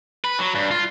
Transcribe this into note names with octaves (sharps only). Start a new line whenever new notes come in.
B4
F#3
G2
F4